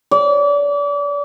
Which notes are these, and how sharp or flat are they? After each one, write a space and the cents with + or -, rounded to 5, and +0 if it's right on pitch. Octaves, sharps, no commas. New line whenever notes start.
D5 -35